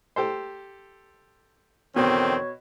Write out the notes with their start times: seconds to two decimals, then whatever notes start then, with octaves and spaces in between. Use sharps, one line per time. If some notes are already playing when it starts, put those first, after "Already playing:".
0.16 G4 A4 C5
1.96 E2 B2 D3 D#3 C4 C#5